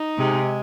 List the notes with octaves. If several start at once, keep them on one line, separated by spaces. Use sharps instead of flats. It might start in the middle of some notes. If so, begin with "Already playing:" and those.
Already playing: D#4
C3 G#3